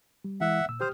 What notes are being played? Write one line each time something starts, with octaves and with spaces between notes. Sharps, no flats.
G3
E3 G#3 E4 E5 F#5
A#2 E6
G4 C5 D#6 F6